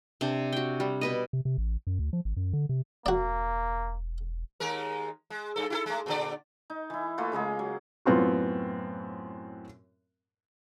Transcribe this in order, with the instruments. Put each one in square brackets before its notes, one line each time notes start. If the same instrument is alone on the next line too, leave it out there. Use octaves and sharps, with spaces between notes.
[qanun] C3 D4 C5
F#4 G5
G3
B2 B4 D#5
[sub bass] C3
C3
A1
F#2
D2
F3
G#1
F#2
D3
C3
[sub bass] E1 [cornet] A#3 [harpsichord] F#4 D5
[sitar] D#2 G#3 A#4
G#3
G2 A4
E4 F#4 A4
G#3 A3
A#2 D3 D5
[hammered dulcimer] D#4
E3 E4
A3 A#3 F4 B4
C#3 G#3 A#3 G#4
F#3
[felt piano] F#2 A2 B3 C4 F4 F#4